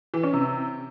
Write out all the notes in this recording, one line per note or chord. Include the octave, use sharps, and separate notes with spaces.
E3
C#4
C3